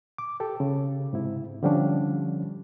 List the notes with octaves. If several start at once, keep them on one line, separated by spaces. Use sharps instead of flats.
D6
G4 A4
C#3
G#2 C3 E4
D3 F3 G3 C#4 D4